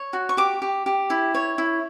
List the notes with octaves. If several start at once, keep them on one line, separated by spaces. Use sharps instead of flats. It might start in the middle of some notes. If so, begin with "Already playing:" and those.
Already playing: C#5
F#4
C#6
G4 D6
G4
G4
E4
C#5
E4